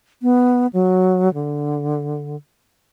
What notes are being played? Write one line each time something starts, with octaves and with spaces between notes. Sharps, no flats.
B3
F#3
D3